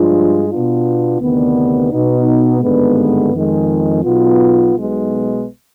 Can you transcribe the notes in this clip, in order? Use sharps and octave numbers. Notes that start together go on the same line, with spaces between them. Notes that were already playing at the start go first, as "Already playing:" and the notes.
Already playing: G2 F3 G#3 D4 F4
B2 B3 D4 F4
D2 C3 D#3 B3 D4
B2 B3 D#4
G#1 G2 D3 G#3 B3
F2 D#3 G#3
B1 B2 B3 F4
B1 B2 G#3 B3